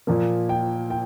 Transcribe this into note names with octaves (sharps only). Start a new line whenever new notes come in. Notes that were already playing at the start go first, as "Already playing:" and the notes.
A#2 F3 A#3
G5
G5